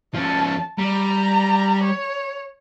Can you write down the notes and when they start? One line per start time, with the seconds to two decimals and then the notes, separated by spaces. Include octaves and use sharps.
0.14 F3 C#4 A5
0.79 G3 A#5
1.83 C#5